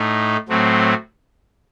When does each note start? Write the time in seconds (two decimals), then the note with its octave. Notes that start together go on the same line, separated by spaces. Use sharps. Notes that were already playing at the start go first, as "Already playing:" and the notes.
Already playing: A2 A3 D#4
0.49 A2 F#3 A3 C4